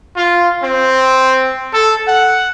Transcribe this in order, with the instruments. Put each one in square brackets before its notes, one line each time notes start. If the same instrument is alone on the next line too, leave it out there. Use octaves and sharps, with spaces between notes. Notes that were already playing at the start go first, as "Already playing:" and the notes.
[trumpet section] F4
C4
A4
F#5